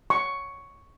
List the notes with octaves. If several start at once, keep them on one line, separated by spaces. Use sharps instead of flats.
C#6